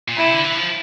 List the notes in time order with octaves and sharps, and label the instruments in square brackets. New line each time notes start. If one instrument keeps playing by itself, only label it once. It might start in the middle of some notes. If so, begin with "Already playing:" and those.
[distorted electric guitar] A#2
[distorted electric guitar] C3 [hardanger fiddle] E4
[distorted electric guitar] D3
E3
F3